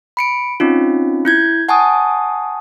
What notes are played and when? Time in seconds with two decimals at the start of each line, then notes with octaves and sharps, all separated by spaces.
0.17 B5 C#7 D7
0.60 C4 C#4 D#4 F4
1.25 E4 G6 G#6
1.69 F#5 G#5 A5 C#6 D#6